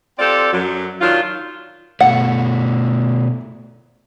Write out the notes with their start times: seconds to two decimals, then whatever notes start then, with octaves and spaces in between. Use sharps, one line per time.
0.18 C4 F4 G4 A4 D5
0.52 F#2 F#3
1.01 D#3 F#3 D4 F4
2.01 B2 A3 F#5